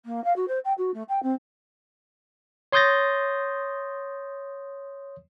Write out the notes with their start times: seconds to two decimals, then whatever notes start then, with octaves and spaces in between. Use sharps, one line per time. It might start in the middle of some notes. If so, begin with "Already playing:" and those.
0.05 A#3
0.24 F5
0.36 F#4
0.48 C5
0.65 G5
0.78 F#4
0.94 A3
1.09 G5
1.23 C4
2.72 C#5 C6 D#6 G6 A6 A#6